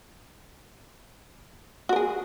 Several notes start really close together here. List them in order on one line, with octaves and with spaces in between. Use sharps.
F#4 A#4 G#4